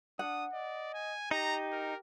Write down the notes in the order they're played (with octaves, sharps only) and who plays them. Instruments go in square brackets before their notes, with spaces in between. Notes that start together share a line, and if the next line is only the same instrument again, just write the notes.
[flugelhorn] D4 [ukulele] F#5 [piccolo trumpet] D#6
[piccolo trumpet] D5 [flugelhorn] D#5
[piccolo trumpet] G#5
[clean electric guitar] D#4 [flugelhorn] G4 [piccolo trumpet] A#5
[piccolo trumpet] A#4